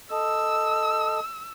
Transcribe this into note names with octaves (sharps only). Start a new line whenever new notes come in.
A4 D#5 E6